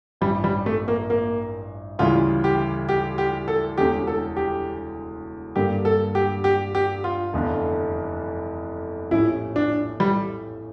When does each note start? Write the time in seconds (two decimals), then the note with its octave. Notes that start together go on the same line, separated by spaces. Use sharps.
0.21 A1 G2 F3 G3 C#4
0.44 G3
0.66 A3
0.88 A#3
1.10 A#3
1.99 D2 C#3 E3 G3 F4
2.44 G4
2.89 G4
3.18 G4
3.48 A4
3.77 E1 E2 D3 A3 C#4 G4
4.07 A4
4.37 G4
5.56 G2 D3 G3 A#3 G4
5.85 A4
6.15 G4
6.44 G4
6.75 G4
7.04 F4
7.33 F1 E2 D3
9.11 A#1 A2 F3 C#4 E4 G4
9.56 D4
10.00 G3